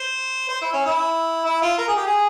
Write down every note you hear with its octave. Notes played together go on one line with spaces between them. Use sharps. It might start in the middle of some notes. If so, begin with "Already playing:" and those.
Already playing: C5
C5
E4
C#4
E4
E4
F4
A#4
G#4
G4
G#4